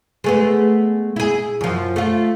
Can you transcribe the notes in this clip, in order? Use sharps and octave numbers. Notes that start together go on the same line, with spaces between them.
G#3 A3 B3
E4 G#4
F#2 F3
A3 F4